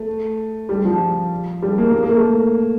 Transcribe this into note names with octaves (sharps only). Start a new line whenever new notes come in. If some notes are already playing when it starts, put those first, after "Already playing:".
Already playing: A3
G3
F3
G3
A#3
A#3
A#3
A3